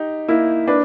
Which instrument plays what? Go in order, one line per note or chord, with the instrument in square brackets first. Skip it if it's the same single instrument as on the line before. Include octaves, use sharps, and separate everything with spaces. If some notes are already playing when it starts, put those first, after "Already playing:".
Already playing: [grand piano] D#4 G4
[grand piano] A#3 [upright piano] E4
[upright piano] D4 [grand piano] B4